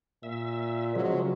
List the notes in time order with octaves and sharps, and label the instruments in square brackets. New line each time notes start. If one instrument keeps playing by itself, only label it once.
[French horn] A#2 [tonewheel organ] E5
[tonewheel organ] C#3 F3 G#3 [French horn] F#3